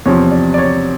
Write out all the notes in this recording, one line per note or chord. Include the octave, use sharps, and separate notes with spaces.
E2 C3 F3 C#5
D5
D5
C#5